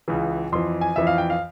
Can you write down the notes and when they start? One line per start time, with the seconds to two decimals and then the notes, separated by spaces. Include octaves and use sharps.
0.08 C#2 C#3 E3
0.52 F2 E3 C6
0.81 G#5
0.96 F2 E3 E5
1.07 F5
1.18 G5
1.30 F5